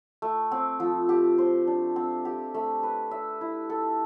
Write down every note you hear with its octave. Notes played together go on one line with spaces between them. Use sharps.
A3
C4
F3
G4
C5
D4
C4
G4
A3
B4
E5
E4
A4